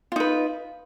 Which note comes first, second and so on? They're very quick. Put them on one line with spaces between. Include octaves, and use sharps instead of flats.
F4 D#4 B4